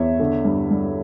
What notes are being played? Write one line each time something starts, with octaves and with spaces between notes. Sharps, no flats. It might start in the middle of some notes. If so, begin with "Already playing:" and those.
Already playing: E2 C#5 E5
D3
G2
G2